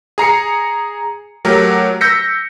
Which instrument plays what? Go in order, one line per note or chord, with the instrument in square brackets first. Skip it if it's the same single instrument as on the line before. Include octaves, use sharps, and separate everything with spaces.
[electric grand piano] G#4 A#5 C7 C#7
F#3 A3 G4 A#4
E6 G6 A#6 B6 C#7